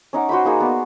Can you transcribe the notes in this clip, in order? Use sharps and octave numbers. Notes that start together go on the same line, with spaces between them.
C#4 D#4 F#5 D6
F#4 C5 G5 B5
A#3 D#4 G#4
B3 B4 D5